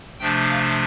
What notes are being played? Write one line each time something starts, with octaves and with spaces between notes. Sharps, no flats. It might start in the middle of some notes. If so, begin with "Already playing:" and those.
C3 F3 A3 D4 G5
F5